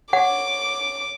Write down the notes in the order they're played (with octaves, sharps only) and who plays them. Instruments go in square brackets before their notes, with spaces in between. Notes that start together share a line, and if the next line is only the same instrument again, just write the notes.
[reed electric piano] C#5 [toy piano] F#5 [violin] D6